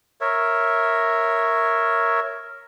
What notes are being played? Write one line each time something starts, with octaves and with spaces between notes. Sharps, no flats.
A#4 C#5 E5